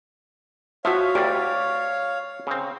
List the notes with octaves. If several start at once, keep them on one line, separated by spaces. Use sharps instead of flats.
F3 F#4 C#5 E5 F5
D2 G3 G4 D5
C#3 C4